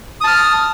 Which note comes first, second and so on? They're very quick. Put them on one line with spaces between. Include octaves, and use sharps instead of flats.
D#6 A5 F6